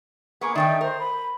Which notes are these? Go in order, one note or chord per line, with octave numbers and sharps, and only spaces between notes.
A#3 B3 G#4 C#6
D#3 A3 D#4 D5 E5 G5
A#4 C5
B5